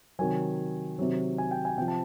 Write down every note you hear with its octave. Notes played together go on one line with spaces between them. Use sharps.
C3 D#3 F#3 G#5
C3 D#3 F#3
G#5
G5
G#5
C3 F3 G5
A5